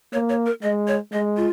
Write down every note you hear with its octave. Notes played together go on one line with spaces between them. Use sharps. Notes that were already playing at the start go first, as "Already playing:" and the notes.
A#3 C#5
C#5
A#4
G#3 D#5
C#5
G#3 D#5
F4